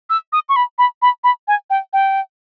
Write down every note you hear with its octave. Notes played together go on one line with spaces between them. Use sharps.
E6
D#6
C#6
B5
B5
B5
B5
G#5
G5
G5